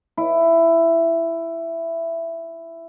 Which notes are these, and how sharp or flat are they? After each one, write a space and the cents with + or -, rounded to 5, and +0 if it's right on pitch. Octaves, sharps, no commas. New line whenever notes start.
E4 +10